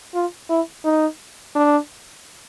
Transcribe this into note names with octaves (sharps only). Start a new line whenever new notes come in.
F4
E4
D#4
D4